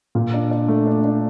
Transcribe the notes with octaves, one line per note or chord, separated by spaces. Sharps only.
A#2
D4
D4
A3
D4
D4